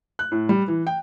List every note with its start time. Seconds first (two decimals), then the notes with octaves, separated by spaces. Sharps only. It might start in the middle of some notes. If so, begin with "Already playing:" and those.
0.19 F#6
0.32 A2
0.49 G3
0.68 E3
0.87 G5